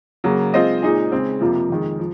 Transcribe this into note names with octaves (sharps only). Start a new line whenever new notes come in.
C#3 F#3 A#3
G#3 C4 F4 C5 D#5
A#2 G#3 D#4 G#4
C#3 G#3 C4
F2 C3 F3 A#3 F4
F2 D#3 G#3
F3